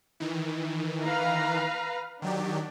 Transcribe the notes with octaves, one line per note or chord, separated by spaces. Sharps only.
D#3 E3
B4 F5 A#5
D#3 F#3 D4 G4